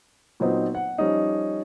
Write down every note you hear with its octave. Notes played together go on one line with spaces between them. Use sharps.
A#2 F#3 B3 C4 D#4
F#5
F3 G3 C#4 D#4